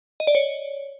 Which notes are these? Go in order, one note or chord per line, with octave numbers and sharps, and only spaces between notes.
D#5
D5
C#5